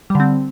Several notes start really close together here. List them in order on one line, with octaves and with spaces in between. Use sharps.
G3 D3 C4